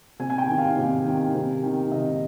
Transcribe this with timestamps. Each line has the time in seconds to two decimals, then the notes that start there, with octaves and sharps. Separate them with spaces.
0.20 C3 G#5
0.30 G#5
0.38 G5
0.48 D#3
0.58 F5
0.77 C3
1.05 D#3
1.35 C3
1.63 D#3
1.92 C3 D#5